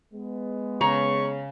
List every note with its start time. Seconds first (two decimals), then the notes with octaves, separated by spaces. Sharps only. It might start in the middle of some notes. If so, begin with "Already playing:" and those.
0.14 G#3 B3
0.81 C#3 C#5 A#5 C#6